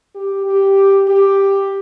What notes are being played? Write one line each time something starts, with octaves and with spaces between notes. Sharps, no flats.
G4
G4
G4